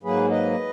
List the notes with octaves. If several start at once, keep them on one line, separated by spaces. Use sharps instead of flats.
G#2 F#3 A#3 G#4 B4
B4 D#5